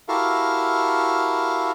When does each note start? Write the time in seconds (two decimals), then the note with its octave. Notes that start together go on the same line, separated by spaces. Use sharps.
0.09 E4 F#4 G4 A4 A#4 F5